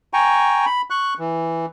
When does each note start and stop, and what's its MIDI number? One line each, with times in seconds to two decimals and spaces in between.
0.13 0.65 79
0.13 0.65 80
0.13 0.65 82
0.13 0.65 85
0.66 0.82 83
0.90 1.14 85
0.90 1.14 90
1.19 1.66 52